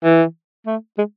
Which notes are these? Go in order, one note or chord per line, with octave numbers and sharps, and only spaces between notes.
E3
A3
G#3